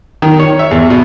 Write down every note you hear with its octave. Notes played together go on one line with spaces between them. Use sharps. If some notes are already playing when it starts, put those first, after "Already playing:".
D#3
C#5
E5
E2
B2